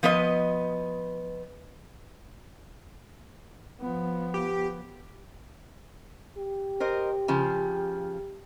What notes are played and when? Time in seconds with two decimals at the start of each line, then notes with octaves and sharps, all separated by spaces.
0.03 F3 B3 B4 D#5
3.81 F3 B3
4.34 G4
6.37 G4
6.80 A#4 C5 D#5
7.28 C#3 F3